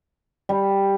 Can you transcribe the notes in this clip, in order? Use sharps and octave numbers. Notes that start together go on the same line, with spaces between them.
G3